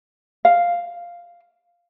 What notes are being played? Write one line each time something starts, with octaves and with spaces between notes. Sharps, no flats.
F5